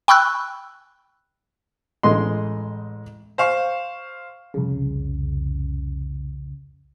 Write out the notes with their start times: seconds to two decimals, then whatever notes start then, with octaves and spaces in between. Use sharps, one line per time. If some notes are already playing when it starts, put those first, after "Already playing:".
0.08 G5 B5 C#6 E6 F#6
2.03 A1 G#3 D#5 C6
3.38 C5 F5 C#6
4.54 C2 F2 C#3